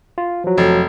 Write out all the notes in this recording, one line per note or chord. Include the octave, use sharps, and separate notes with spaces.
F4
F3 F#3
F1